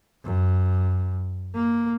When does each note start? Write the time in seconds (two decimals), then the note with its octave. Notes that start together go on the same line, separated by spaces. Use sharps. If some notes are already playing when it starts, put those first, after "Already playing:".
0.24 F#2
1.55 A#3